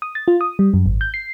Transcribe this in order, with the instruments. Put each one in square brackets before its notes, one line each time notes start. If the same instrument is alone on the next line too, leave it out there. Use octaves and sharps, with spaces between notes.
[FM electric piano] D#6
A6
F4
D#6
G3
F#2
G#1
G6
C7